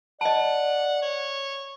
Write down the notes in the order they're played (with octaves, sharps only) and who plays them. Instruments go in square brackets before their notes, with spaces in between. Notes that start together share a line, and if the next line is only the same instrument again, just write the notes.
[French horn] D5 [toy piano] D#5 A5 [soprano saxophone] F#5
[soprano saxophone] C#5